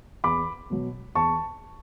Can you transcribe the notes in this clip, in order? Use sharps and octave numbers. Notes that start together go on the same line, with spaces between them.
E2 B5 D6
B2 F#3
E2 A5 C#6